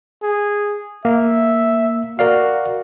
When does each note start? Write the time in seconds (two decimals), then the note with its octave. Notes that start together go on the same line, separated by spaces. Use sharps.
0.23 G#4
1.05 A#3 E5
2.19 F#4 A#4 D5 F5